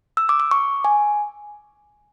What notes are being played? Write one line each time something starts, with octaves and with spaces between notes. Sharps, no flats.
E6
D6
D6
C#6
G#5